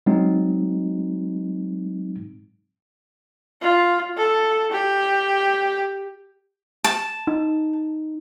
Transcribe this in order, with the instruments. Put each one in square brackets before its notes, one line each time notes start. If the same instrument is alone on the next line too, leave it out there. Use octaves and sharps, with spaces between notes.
[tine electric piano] F#3 G#3 C4 D#4
[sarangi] F4
A4
G4
[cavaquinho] A5
[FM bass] D#4